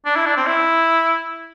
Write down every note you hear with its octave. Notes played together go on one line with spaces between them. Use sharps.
D4
E4
D4
C4
E4